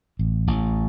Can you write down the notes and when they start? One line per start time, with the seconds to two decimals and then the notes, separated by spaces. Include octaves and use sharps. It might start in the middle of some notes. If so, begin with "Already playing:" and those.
0.19 A1
0.47 A1